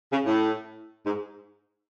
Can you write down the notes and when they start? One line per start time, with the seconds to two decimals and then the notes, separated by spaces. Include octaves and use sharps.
0.11 C#3
0.26 A2
1.06 G#2